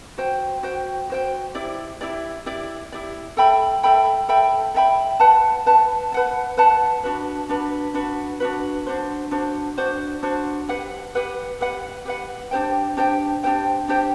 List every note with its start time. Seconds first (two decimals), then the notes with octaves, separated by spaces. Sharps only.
0.18 F#4 C5 G5
0.63 F#4 C5 G5
1.09 F#4 C5 G5
1.55 E4 G4 D5
2.01 E4 G4 D5
2.46 E4 G4 D5
2.92 E4 G4 D5
3.37 A4 E5 G5 B5
3.83 A4 E5 G5 B5
4.29 A4 E5 G5 B5
4.75 A4 E5 G5 B5
5.20 B4 F#5 A5
5.66 B4 F#5 A5
6.12 B4 F#5 A5
6.57 B4 F#5 A5
7.03 D4 F#4 B4
7.49 D4 F#4 B4
7.94 D4 F#4 B4
8.40 D4 F#4 B4
8.86 D4 F#4 C5
9.31 D4 F#4 C5
9.78 D4 F#4 C5
10.23 D4 F#4 C5
10.69 G4 B4 F#5
11.15 G4 B4 F#5
11.61 G4 B4 F#5
12.05 G4 B4 F#5
12.51 D4 G4 C5 G5
12.97 D4 G4 C5 G5
13.43 D4 G4 C5 G5
13.88 D4 G4 C5 G5